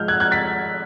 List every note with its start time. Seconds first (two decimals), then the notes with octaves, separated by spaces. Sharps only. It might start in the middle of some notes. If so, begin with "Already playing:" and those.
Already playing: G#2 F3 G#3 F6 G6
0.08 F#6 G#6
0.20 F#6 G#6
0.31 A6 B6